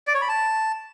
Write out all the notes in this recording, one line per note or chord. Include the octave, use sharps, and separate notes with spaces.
D5
C#5
B5
A5